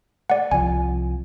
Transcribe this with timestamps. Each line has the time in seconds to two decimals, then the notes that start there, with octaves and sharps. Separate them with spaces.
0.30 D5 F#5
0.51 C2 F3 G#5